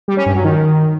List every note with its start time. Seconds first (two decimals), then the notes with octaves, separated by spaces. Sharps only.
0.08 G3
0.17 C#4
0.26 G2
0.35 F#3
0.44 D#3